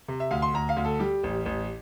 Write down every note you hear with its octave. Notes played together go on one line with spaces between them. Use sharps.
C3
E5
D2 F5
C6
D2 A#5
F5
D2
A4
G3 G4
A1
A1